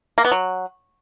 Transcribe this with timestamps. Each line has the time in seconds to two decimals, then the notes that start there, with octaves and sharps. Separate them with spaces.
0.18 A#3
0.25 B3
0.31 F#3